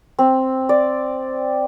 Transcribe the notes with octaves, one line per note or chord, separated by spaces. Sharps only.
C4
D5